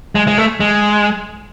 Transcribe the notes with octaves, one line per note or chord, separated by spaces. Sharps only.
G#3
G#3
A3
G#3